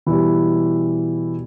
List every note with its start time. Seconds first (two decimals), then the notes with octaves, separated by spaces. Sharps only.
0.06 B2 E3 G3 E4